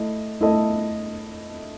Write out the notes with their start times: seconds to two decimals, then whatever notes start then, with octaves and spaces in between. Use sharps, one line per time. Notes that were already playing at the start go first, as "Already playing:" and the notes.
Already playing: A3 E4 D#5
0.40 A3 E4 A4 D#5